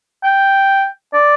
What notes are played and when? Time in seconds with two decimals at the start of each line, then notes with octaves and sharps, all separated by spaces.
0.24 G5
1.13 D5